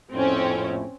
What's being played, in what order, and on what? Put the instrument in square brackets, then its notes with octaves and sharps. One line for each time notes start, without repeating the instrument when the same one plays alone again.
[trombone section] A#1 F2 A2 [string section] C4 C#4